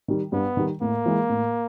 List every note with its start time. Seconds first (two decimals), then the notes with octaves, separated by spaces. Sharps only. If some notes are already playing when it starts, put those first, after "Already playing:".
0.08 D#3 G3
0.32 G2 B3
0.57 D#3 G3
0.81 A2 A#3
1.06 E3 G#3
1.29 A2